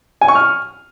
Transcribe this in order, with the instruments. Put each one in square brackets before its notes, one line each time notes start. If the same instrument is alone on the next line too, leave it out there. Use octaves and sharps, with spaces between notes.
[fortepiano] G#5
C#6
F6